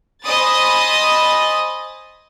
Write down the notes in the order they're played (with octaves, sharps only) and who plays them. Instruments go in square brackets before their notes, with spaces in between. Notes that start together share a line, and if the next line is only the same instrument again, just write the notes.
[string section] C5 D#5 G#5 B5 D#6 A6